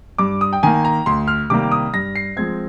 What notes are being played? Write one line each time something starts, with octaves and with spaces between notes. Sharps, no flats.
G2 D6
D#6
G5
D#3 A#3 G#5
A#5
D2 C6
F6
C3 D#3 G3 A#3 D6
D#6
G2 A#6
C7
F3 G#3 C4 G#6